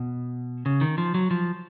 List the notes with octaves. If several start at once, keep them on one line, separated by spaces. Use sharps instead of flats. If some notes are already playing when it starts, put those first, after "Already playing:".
Already playing: B2
C#3
D#3
F3
F#3
F3